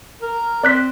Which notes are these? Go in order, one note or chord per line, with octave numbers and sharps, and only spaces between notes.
A#4
C4 D5 F#6 B6